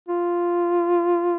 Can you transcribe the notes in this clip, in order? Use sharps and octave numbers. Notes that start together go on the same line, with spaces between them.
F4